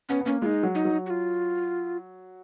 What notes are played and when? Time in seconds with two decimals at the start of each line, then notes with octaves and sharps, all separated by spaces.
0.09 B3 C#4
0.21 B3
0.26 A#3 C#4
0.42 G#3 D#4 F4
0.63 F#3
0.75 D#4
0.85 F#3
1.06 F#4
1.10 F4